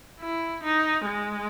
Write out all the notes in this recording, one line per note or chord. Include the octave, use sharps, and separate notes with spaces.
E4
D#4
G#3